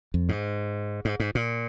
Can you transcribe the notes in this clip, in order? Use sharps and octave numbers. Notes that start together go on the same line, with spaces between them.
F2
G#2
G#2
G#2
A#2